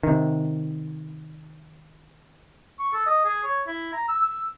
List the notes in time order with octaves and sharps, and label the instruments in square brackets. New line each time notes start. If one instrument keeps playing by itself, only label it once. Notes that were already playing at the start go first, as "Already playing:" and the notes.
[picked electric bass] C3 D#3
[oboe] C#6
A4
D#5
G#4
C#5
E4
A#5
E6
E6